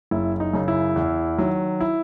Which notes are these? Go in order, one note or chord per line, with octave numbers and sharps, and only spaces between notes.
F#1 E4
D#4
F#2 C#3
E4
E2
D#3 F#3
E4